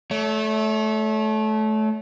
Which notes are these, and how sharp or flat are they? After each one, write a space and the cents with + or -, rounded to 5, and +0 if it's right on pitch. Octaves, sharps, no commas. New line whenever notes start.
A3 -20 C#5 +40